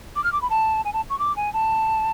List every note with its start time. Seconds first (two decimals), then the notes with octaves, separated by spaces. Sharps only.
0.16 D6
0.24 F6
0.32 D6
0.42 B5
0.50 A5
0.85 G#5
0.93 A5
1.10 C#6
1.19 D6
1.36 G#5
1.53 A5